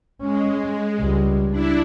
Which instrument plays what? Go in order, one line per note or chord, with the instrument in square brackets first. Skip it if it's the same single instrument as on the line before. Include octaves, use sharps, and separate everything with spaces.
[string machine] G#3 [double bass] C#4
[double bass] C#2 G3
[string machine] D4 E4